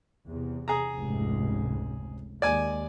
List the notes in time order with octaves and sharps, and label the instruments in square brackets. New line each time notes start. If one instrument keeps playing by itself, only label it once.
[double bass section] E2 C3
[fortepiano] G#4 A#5
[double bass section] F1 C#2 G#2
[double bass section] D#2 G#3 [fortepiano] D5 G#5